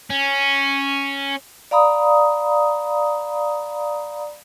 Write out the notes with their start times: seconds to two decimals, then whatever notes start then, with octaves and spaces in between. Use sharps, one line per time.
0.10 C#4
1.71 D5 F5 A#5 B5 D#6